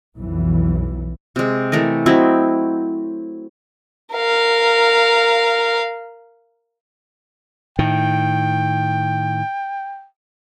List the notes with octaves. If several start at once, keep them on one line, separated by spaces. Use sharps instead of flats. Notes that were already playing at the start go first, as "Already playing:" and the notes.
B1 F2 E3
C3 G#3
E3 A3 A#4 D#5
F#3 C4 E4 D#5
A#4 F5
A2 D#3 G5